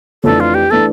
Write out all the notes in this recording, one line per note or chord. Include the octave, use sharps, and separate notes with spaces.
F2 E3 A3 D4 A4
F4
G4
E3 A3 D4 A4